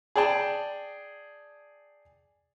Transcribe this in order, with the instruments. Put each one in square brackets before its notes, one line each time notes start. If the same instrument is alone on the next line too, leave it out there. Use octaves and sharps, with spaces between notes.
[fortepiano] G#4 D5 G5 A5